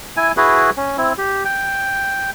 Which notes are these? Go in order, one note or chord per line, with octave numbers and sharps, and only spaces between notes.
E4 G#5
E4 F#4 G#4 B4
C#4
C4 E4
G4
G5